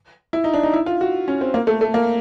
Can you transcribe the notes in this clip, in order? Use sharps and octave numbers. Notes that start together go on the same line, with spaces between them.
E4
D#4
D4
D#4
E4
F4
F#4
C#4
C4
A#3
A3
A3
A#3